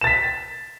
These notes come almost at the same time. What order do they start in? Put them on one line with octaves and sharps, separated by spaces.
E7 A6 B6